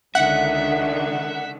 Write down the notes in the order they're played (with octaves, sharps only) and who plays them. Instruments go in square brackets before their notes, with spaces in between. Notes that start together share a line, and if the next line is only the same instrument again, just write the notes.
[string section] C#2 D3 D#3 [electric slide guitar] E5 [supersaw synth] F#5